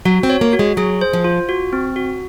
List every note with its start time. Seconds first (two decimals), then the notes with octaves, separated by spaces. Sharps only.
0.05 F#3 F#4
0.23 C4
0.30 C#5
0.41 A#3
0.53 F#4
0.59 G#3
0.77 F#3 G#4
1.01 C5
1.13 F3
1.24 F4
1.49 F#4
1.73 C4
1.96 F#4